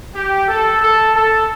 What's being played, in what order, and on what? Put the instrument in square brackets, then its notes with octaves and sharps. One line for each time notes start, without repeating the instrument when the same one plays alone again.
[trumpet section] G4
A4
A4
A4